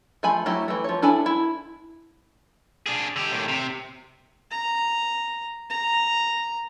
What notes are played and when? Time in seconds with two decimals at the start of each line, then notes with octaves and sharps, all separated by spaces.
0.23 F3 A3 G#5 B5
0.46 F#3 A3 E4 G4
0.68 E3 A3
0.84 F3 C#5
1.02 D4 E4 A4 G#5 B5
1.26 E4
2.86 D4 G#4
3.16 D3 G4
3.32 A2 D#3
3.48 C3
4.51 A#5
5.70 A#5